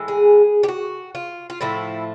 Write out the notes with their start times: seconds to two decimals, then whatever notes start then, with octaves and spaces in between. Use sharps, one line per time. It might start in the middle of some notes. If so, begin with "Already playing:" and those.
Already playing: A2 E3 G#3
0.08 G#4
0.63 G4
0.68 F#4
1.15 F4
1.50 F4
1.61 A2 F3 A3 E4